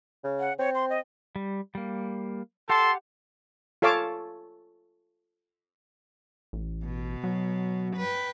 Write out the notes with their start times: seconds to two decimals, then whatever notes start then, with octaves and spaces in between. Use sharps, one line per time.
0.24 C#3
0.40 F#5
0.59 C4 C#5
0.75 C6
0.90 D#5
1.36 G3
1.75 G3 A#3
2.70 G4 A4 F#5 A5 C6 D6
3.82 F4 A4 C#5 F5 A5 D6
6.53 A1
6.85 B2
7.24 F#3
7.96 B4 G5